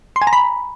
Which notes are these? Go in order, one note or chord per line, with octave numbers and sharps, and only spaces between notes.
C6
G#5
A#5
B5